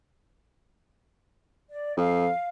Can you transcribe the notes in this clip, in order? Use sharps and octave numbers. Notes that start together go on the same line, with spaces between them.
D5
F2 F5